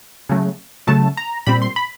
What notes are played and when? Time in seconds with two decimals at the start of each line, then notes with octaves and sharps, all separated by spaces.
0.29 C#3 F#3 A3
0.87 C#3 F#3 A3 A5
1.17 A#5
1.46 A#2 G3 C4 B5
1.62 C6
1.76 B5